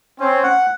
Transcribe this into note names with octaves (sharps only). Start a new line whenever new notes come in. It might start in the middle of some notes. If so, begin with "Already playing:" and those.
C4 C#4
F#5